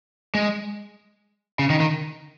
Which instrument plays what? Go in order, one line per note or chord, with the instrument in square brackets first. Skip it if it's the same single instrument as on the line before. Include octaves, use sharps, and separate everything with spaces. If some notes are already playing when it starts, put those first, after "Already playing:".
[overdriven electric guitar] G#3
C#3
D#3
D#3